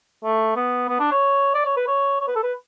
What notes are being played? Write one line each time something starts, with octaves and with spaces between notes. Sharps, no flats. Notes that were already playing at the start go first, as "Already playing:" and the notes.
A3
B3
B3
D4
C#5
D5
C#5
B4
C#5
C#5
B4
A4
B4